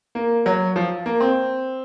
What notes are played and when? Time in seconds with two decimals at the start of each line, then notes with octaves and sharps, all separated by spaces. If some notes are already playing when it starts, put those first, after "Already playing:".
0.15 A#3
0.46 F#3
0.76 F3
1.06 A#3
1.20 C4